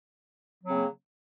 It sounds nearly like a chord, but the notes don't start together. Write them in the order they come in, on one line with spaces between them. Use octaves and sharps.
F#3 C4 C#3 A#3